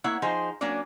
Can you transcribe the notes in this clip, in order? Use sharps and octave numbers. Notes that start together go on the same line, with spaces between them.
A#3 E4 C#5 F#5
F3 D#4 G#4 C5
F#3 A#3 C#4 D4 D5